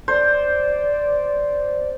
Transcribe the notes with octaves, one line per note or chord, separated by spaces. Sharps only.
C5 D5